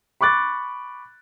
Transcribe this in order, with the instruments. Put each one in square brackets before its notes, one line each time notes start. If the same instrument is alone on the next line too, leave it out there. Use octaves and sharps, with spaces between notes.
[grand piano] B5 C#6 D6 F#6 A6